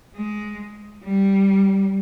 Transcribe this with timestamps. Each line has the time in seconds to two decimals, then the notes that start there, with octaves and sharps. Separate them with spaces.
0.16 G#3
1.04 G3